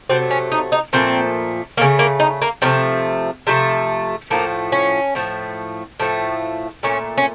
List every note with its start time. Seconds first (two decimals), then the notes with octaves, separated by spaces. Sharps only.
0.09 C3 F#3 A3 C4
0.30 C#4
0.52 D#4
0.72 D#4
0.93 A#2 F3 A3 C4
1.77 C#3 A3 A#3
1.99 A#3
2.20 D#4
2.42 A#3
2.62 C3 F3 A3 C4
3.47 C3 F3 A3
4.30 A2 F3 A3 A#3
4.72 C#4
5.15 A2 F3 A3
6.00 A2 F3 A3
6.83 A#2 A3 C#4
7.18 C#4